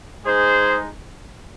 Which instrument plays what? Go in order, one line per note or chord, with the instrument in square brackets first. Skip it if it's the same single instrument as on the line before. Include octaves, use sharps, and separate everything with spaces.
[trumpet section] G#3 D#4 G#4 C5